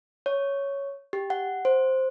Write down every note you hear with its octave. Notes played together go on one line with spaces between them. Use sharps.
C#5
G4
F#5
C5